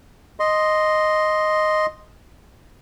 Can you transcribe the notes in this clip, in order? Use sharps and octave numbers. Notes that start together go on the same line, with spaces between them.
D#5 C6